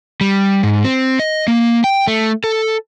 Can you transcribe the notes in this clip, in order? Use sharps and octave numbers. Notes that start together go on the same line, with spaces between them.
G3
G#2
C4
D#5
A#3
G5
A3
A4